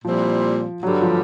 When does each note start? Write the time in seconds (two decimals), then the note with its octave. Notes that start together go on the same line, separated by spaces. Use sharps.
0.05 A#2 F3 G3 C4 E4
0.82 G2 D3 F#3 G3
1.02 F3